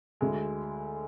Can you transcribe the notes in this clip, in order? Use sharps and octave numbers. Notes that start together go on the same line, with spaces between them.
D2 D3 G#3